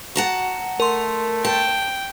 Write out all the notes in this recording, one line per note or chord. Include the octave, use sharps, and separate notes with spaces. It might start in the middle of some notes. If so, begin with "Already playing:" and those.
F#4 F#5 A5 A#5
A3 A#4 C6
G5 A5